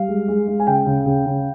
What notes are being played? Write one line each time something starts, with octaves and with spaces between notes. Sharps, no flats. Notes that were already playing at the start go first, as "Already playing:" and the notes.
Already playing: G3 F5
G#3
G#3
G#3
G#5
C#3 G5
C#3
C#3
C#3